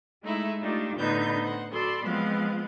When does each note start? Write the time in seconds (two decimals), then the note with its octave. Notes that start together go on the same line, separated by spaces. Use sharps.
0.22 G#3 A3 D#4 E4
0.62 A3 D4 D#4 F4 G4
0.96 A2 D3 B3 D#4 B4 G6
1.42 C5 F#5
1.71 F#4 A4 D5 B5 C6
2.03 F3 G#3 B3 C4 F5 F#6